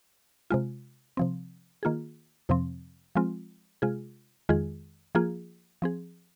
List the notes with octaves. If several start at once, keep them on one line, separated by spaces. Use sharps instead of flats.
C3 G#3 F4
C3 F3 C4
D#3 A#3 F4 G#4
F2 C3 F3 C4
F3 G#3 C4 F4
C3 G#3 F4 G#4
F2 D#3 G#3 F4 G#4
F3 A#3 F4 G#4
F3 C4 G#4